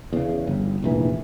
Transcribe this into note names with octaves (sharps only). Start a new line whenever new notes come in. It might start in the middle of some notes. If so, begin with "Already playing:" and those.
E2 C#3
G1
F1 A#1 E3